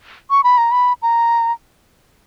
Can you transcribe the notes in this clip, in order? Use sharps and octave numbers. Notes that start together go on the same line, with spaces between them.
C#6
B5
A#5
B5
A#5